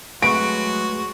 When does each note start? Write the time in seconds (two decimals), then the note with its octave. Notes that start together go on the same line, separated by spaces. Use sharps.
0.22 F#3 G#3 A3 F#4 B4 C#6 D7